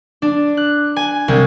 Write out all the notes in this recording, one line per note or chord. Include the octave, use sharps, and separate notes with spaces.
D4
F#6
G#5
C2